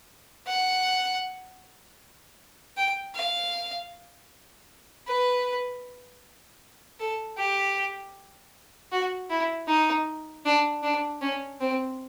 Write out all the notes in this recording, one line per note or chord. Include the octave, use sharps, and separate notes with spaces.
F#5
G5
F5
B4
A4
G4
F#4
E4
D#4
D4
D4
C#4
C4